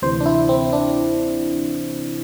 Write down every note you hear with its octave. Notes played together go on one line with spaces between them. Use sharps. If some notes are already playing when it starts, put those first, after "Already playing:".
D2 C3 E3 C5
D4
E4
C4
D4